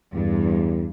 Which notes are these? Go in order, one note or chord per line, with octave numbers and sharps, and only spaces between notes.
E2 G2